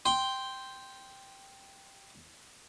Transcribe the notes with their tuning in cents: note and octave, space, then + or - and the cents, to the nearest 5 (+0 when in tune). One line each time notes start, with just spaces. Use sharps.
G5 +0 C6 +0